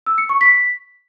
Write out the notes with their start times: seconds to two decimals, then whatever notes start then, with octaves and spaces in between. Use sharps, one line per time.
0.06 E6
0.18 C#7
0.29 C#6
0.41 B6